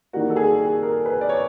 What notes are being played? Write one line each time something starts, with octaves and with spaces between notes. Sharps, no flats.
D#3 G3 A#3 F#4
A4
G#4
G#4
A#4
B4
D5
C#5